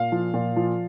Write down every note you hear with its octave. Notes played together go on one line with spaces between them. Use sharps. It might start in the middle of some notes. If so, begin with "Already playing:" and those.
Already playing: A#2 F5
F3
A#2
F3